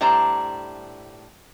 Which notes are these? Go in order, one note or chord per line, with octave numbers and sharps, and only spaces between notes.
A2 G3 D4 C5 A#5